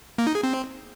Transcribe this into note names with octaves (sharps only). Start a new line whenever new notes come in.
A#3
D#4
G#4
C4